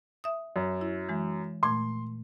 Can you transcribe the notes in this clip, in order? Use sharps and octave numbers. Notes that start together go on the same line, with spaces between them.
E5 D#6
F#2
E4
E3 G#3
A#2 A3 C6 G#6